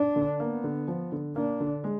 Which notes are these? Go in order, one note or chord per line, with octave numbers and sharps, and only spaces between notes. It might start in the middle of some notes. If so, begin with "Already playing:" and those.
Already playing: D4
D3
A#3 B3
D3
F3
D3
A#3 D4
D3
G#3